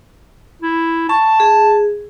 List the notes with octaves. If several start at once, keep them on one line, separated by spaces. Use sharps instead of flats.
E4
A5 C#6
G#4